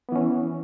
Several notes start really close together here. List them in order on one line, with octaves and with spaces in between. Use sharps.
B3 E3 C#4